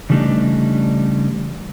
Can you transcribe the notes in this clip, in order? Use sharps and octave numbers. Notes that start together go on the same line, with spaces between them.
C#3 E3 G3 A3 D4 D#4